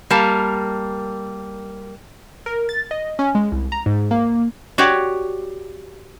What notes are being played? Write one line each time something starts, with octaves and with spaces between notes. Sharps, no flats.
G3 A#3 A#4 A5
A#4
A6
D#5
C#4
G#3
C2
A#5
G#2
A#3
F#4 G4 C#5 D5